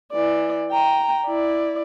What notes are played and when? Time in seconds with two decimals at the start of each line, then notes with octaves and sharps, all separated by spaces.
0.12 E3 D5
0.71 G5 A#5
1.26 E4 D5